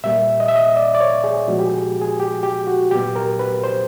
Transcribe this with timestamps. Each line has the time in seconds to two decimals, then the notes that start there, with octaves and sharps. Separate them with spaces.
0.04 A#2 G3 A#3 E5
0.40 D#5
0.48 E5
0.56 D#5
0.76 D5
0.95 D5
1.00 C#5
1.24 G#4
1.48 A#2 F3 G#3 B3 F#4
1.59 G4
1.66 G#4
2.02 G#4
2.20 G4
2.43 G4
2.67 F#4
2.91 A#2 F#3 B3 G4
3.16 A#4
3.39 B4
3.64 C5